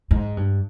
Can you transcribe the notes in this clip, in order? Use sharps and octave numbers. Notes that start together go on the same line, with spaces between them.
G#2
G2